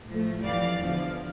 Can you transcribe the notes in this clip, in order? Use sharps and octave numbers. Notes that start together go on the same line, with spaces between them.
A2 F3 A3
F2 E3 G3 D5 F5
E2 D3 F3